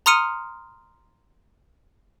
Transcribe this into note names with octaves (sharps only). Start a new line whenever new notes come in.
A#5 C6 D#6 F6 C#7 D#7